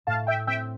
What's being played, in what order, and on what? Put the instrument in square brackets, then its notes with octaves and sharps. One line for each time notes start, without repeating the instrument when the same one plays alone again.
[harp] A2 [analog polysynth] F5 A5
[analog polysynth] E5 G5
[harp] C4 [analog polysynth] E5 G5